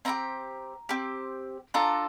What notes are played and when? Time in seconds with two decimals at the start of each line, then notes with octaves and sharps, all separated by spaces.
0.05 C4 E4 G4 A#5
0.89 C4 G4
1.74 D4 F4 A4 A#5